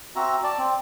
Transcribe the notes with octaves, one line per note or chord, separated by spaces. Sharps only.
C4 F#4 E5 A#5
D5 A5
C4